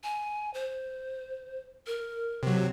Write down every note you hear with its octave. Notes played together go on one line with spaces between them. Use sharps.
G#5
C5
A#4
C3 F#3